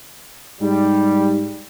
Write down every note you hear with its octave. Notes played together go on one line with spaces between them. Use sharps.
G#2 G3